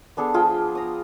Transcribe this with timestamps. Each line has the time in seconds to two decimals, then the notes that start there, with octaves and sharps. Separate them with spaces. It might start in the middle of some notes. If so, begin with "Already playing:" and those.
0.17 B3 D4 G#4 A4
0.34 F3 F4 G#4 G5
0.75 A#5 D#6